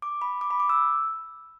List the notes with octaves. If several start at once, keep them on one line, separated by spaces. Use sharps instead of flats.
D6
B5
D6
B5
D6
E6